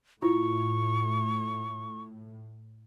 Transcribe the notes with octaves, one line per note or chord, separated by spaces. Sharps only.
A2 E4 F4 C#6